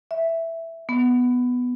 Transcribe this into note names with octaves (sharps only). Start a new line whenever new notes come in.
E5
B3